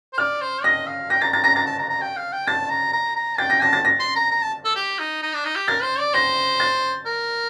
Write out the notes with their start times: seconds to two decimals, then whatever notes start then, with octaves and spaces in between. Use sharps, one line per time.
0.13 C5
0.18 D5 F6
0.41 C5
0.64 D#5 A#6
0.87 F5
1.10 G5 A#6
1.22 A#5 A6
1.33 A#5 A6
1.44 A#5 A#6
1.56 A#5 A6
1.67 A5
1.79 A#5
1.90 A#5
2.01 G5
2.17 F5
2.33 G5
2.47 A5 A6
2.70 A#5
2.93 A#5
3.16 A#5
3.38 G5 A6
3.50 A#6
3.62 A5 A#6
3.73 A6
3.85 A#6
4.00 C6
4.16 A#5
4.31 A#5
4.42 A5
4.65 A4
4.76 G4
4.99 D#4
5.23 D#4
5.34 D4
5.45 D#4
5.56 G4
5.68 A#4 A6
5.83 C5
5.99 D5
6.14 C5 A#6
6.60 A6
7.06 A#4